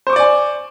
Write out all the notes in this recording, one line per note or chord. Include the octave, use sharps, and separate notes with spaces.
C5 D5 G#5 C#6 D6